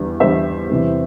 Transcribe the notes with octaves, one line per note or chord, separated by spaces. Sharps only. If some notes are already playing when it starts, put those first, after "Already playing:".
Already playing: E2 D3 G3
E2 D3 G3 C5 E5
E2 C3 E3 G3